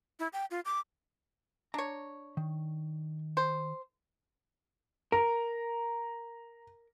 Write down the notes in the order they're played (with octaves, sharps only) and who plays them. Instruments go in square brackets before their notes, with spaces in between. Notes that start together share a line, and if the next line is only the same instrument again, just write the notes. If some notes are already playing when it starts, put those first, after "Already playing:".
[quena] E4
G5
F4
D6
[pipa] D4 C#5 [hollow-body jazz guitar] A#5
[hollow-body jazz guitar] D#3
[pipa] C5
[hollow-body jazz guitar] A#4 [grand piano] A#5